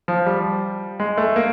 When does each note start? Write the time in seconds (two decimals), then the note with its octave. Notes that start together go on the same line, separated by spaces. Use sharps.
0.08 F3
0.26 G3
1.00 G#3
1.18 A3
1.36 A#3